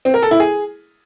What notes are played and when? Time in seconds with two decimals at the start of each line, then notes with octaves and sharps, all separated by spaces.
0.05 C4
0.14 A#4
0.22 A4
0.31 E4
0.40 G#4